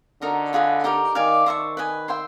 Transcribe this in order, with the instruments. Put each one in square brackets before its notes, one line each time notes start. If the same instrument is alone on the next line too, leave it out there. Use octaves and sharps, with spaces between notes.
[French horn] D3 [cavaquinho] D#4 F#4 A#4 D#5
[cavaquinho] F4 G#4 B4 D#5
D#4 G4 A#4
[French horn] D#3 [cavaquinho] D5 F5 G#5
[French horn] D#3 [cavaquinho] C5 E5 A5 C#6
[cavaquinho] B4 D#5 G#5
C5 E5 G5 C6